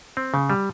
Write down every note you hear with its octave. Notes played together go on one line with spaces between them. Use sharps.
C4
C#3
G3